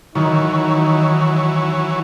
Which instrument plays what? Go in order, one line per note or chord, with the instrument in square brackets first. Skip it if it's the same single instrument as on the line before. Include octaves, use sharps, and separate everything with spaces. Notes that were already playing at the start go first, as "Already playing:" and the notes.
[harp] D#3 [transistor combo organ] E3 F#3 C#5 [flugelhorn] D#4